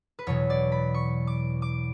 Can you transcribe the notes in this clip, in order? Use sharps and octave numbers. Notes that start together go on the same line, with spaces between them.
B4
E2 B2 F#3 C#5
D5
B5
C#6
D6
D6